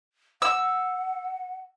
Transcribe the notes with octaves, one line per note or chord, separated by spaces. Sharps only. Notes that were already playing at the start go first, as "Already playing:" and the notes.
F#5 E6